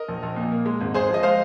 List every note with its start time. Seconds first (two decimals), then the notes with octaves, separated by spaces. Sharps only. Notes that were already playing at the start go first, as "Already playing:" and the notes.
Already playing: A#4 D#5
0.08 A#1
0.23 A#1
0.36 A#2
0.52 A#3
0.66 G#3
0.81 G#1
0.94 G#2 G#4 C5
1.09 F3
1.14 D#5
1.23 G#3 C5 F5